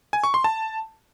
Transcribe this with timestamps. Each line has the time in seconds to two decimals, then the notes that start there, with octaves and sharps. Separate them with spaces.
0.13 G#5
0.24 C#6
0.34 C6
0.44 A5